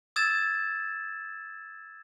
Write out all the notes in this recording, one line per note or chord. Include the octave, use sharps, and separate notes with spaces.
D#6 E6 G#6 A6 E7